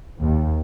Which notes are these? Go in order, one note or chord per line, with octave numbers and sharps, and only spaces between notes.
D#2